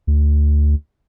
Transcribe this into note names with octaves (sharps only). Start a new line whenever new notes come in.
D2